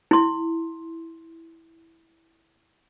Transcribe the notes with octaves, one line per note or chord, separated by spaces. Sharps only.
E4 C6